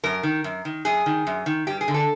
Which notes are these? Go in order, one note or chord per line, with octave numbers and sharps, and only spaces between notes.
F#2 A#4
D#3
F#2
D#3
F#2 G#4
D#3
F#2
D#3
G2 G4
G#4
D3
A4